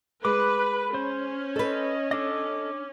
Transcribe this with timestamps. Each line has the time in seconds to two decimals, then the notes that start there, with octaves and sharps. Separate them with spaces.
0.25 G#3 B4 B5 D6
0.94 C#4 C5
1.56 A4 B4 D#5
2.11 D4 A4 D#5 D6